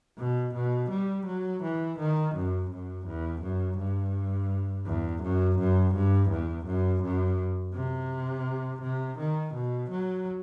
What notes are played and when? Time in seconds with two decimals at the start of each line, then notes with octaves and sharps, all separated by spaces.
0.18 B2
0.55 B2
0.91 G3
1.26 F#3
1.63 E3
1.99 D#3
2.35 F#2
2.71 F#2
3.07 E2
3.42 F#2
3.78 G2
4.86 E2
5.23 F#2
5.59 F#2
5.95 G2
6.30 E2
6.66 F#2
7.03 F#2
7.74 C3
8.82 C3
9.18 D#3
9.55 B2
9.90 F#3